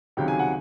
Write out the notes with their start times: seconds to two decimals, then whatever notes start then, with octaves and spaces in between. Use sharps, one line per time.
0.17 C#2 C3 D#3 F#3 G5
0.28 G#5
0.39 F#5